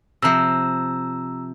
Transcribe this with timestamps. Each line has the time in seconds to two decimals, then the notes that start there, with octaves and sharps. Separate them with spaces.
0.22 C3 F3 A#5 E6